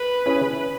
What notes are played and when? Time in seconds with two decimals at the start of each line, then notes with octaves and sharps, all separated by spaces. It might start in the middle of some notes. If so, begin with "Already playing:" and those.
Already playing: B4
0.26 C#4 E4 G#4